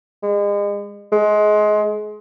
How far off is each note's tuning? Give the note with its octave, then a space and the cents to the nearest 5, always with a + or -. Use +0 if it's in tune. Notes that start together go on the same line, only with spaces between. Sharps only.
G#3 -35
G#3 +25